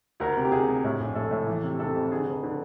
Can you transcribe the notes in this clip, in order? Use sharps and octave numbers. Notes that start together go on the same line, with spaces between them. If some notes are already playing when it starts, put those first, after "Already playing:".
D2 A#4
C3
G4
C3 G#4
C3
A2
A#1
A2 A4
A2
E3
C3
C3 A4
F2
D3 G#4
F1
D3